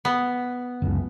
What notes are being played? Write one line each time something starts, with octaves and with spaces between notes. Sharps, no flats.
B3
F#1 C#2